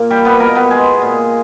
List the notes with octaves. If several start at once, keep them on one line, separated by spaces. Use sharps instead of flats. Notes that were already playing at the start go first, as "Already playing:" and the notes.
Already playing: A#2 A#3
G3 G4
B3 B4
B2 A#3 A#4
B3 B4
G#3 G#4
A#2